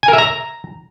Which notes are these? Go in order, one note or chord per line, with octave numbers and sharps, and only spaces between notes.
G#5
A#4
E5
A#5